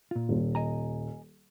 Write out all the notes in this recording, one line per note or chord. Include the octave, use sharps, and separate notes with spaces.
A#2 F4
D#1
D#5 G#5 A#5